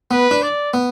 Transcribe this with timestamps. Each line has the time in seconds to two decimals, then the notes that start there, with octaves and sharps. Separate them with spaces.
0.11 B3 B4
0.31 D4
0.42 D5
0.74 B3